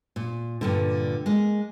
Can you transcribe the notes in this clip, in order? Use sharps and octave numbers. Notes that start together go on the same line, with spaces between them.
A#2
G2 A#2 D3
G#3 A#3